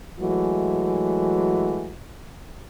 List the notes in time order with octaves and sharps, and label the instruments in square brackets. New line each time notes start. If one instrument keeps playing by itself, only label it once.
[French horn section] E3 F#3 G#3 A3 F#4